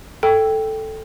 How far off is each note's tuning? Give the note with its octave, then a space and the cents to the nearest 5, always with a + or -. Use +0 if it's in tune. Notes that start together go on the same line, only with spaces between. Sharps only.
A4 +0 G5 +0